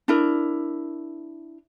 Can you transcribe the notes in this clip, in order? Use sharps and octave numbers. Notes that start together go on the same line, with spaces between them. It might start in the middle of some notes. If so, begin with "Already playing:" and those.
D4 E4 A#4